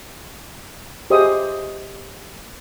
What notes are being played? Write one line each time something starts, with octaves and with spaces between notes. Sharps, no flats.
G4 G#4 C5 D#5 E5 D#6